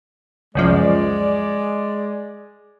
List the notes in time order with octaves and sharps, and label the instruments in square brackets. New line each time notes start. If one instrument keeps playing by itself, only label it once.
[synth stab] C#2 F#2 F3 [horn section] G#3 D5